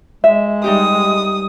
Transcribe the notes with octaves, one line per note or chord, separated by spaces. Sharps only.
G#3 E5
G3 D#4 G4 D#6